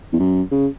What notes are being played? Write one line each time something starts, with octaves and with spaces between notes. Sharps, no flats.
E2
F#2
C#3